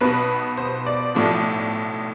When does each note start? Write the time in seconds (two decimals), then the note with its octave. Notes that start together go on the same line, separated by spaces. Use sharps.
0.01 B1 B2 B3 B4
0.57 C5
0.86 D5
1.15 B1 A2 F3